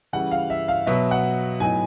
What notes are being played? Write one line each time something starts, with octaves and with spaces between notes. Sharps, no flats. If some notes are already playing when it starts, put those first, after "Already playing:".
C#3 E3 G3 F#5
F5
E5
F5
B2 F#3 B3 E5
F#5
A2 F#3 B3 D#4 G#5